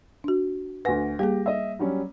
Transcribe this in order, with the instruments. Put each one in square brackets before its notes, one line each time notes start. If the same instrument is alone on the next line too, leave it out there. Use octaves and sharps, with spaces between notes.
[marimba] D4 F#4
[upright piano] D2 A#6 [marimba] B4 F#5 G#5
[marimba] G3 A#3 G#4 [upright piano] G4
[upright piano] D#5 E5
F#3 G3 C#4